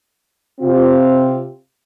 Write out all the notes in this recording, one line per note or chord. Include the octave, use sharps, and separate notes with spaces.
C3 C4 F4